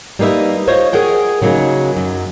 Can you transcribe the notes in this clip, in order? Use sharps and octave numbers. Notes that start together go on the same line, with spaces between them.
G3 A#3 D#4 B4 E5
F4 C5 C#5 D#5
G#4 A#4 F#5 G5
C#3 F#3 A#3 D#4 G#4
F#2